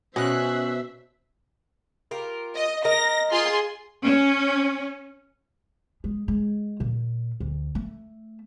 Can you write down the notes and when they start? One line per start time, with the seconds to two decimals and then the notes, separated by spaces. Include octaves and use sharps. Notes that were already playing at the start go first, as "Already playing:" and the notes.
0.16 B2 C#4 C5 E5 F#6
2.11 F4 G4 A#4
2.55 D#5
2.85 A#4 D#5 A#5 A#6
3.31 F4 G#4 C6
4.02 C#4
6.04 G#3
6.28 G#3
6.80 A#2
7.40 D2
7.75 A3